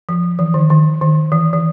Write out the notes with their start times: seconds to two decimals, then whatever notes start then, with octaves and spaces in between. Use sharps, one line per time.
0.09 F3
0.39 E3
0.54 D#3
0.70 D#3
1.01 D#3
1.32 E3
1.53 E3